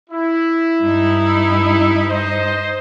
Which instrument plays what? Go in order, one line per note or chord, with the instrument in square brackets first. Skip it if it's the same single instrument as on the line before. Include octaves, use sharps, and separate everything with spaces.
[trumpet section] E4
[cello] G2 D#4
[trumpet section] C5 D#5